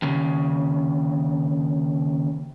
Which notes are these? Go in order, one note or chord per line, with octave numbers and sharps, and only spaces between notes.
D#2 C#3